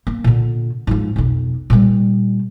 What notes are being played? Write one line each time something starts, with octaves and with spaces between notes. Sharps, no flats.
A#3
A#2 D3
G#2 F3
B1 F2
A#2 G3